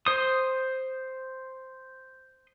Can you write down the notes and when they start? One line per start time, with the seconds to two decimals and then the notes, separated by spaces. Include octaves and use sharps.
0.07 C5 D#6